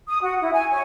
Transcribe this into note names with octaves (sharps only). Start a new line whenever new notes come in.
D#6
F#4
E4
G#5
C#5